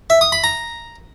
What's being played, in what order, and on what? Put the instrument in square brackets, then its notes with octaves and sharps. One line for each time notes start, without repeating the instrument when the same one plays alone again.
[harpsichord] E5
D#6
B5
A#5